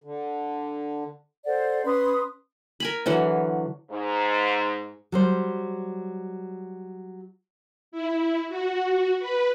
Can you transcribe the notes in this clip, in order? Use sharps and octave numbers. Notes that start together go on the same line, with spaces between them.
D3
A4 C5 D5 F#5
C#4 B4 C6 D#6
A#4 G#5 B5
D3 E3 F#3
G#2
F#3 G3 C5
E4
F#4
B4